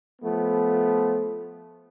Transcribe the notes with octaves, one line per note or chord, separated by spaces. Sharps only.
F3 A3 B3